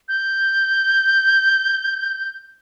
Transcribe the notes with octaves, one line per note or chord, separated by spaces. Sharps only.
G6